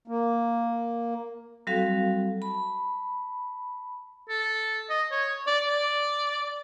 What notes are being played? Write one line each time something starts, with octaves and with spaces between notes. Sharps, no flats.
A#3
F#3 G3 C4 F#4 A4 F5
A5 B5
A4
D#5
C#5
D5
D5